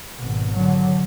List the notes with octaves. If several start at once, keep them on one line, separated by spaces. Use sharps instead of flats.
G#1 B2
D3 F#3